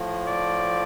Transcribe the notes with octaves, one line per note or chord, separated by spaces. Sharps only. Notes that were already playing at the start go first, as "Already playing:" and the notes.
Already playing: A2 F3
D5